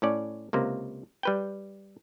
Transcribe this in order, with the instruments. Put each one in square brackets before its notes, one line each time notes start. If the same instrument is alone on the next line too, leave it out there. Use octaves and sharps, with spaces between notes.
[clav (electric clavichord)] A2 C#4 D5
C#2 C3 A#3
G3 B4 G5